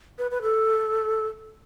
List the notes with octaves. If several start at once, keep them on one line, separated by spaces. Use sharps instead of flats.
B4
B4
A4